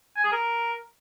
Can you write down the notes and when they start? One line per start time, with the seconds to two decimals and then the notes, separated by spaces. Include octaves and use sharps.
0.16 G#5
0.24 G#4
0.32 A#4